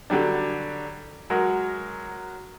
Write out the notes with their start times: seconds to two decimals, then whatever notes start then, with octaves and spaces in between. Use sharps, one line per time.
0.10 D3 F#3 G3 D4
1.30 F#3 G#3 F#4 A#4